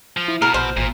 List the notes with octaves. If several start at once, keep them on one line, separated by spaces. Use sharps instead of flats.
F3
E4
B2 A#4
A#1 C5
G#1 A#2